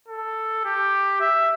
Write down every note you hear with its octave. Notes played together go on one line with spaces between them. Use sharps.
A4
G4
E5